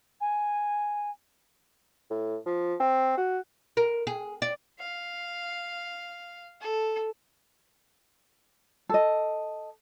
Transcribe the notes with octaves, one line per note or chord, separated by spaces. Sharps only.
G#5
A2
F3
C4
F#4
A#4
G#4
D5
F5
A4
A4 D#5